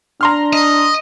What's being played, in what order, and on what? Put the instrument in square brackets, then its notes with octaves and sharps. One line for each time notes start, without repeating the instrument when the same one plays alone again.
[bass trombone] D4 [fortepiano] A#5 C6 F6
[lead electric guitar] D#5